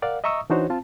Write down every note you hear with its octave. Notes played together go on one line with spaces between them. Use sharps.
A#4 D5 F5 F#5
D#5 E5 A#5 C#6 D#6 E6
E3 D4 D#4 F#4 C5 C#5
C4 F4 A5